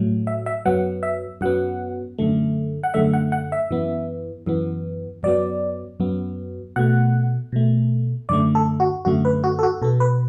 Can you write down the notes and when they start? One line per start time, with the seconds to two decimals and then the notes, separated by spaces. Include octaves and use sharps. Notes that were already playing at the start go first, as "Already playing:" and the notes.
Already playing: A2 F#3 A3
0.27 E5
0.46 E5
0.65 F#2 F#3 B3 F#5
1.03 E5
1.41 F#2 F#3 B3 F#5
2.18 F#2 D3 A3
2.84 F#5
2.94 F#2 D3 A3 E5
3.14 F#5
3.32 F#5
3.52 E5
3.71 F#2 E3 B3
4.46 F#2 E3 B3
5.23 F#2 F#3 B3 D5
6.00 F#2 F#3 B3
6.76 B2 A3 F#5
7.52 B2 A3
8.29 F#2 D3 A3 D5
8.55 A4
8.80 F#4
9.05 F#2 D3 A3 F#4
9.25 B4
9.44 F#4
9.59 A4
9.63 F#4
9.82 B2 B3 A4
10.00 B4